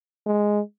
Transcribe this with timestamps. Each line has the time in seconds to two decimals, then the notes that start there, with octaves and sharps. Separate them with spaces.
0.26 G#3